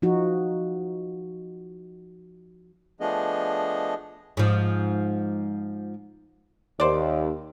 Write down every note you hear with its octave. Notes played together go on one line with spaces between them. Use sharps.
F3 D#4 F#4
F3 A3 B3 D4 G#4 D#5
G#2 F3
D#2 C5 D5